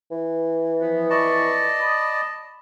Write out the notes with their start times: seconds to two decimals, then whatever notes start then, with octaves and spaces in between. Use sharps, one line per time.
0.11 E3
0.80 F3 B3
1.10 F2 D5 D#5 A5 B5 C#6
1.80 B5 D#6